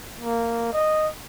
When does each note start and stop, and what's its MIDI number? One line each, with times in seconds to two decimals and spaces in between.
0.21 0.68 58
0.72 1.08 75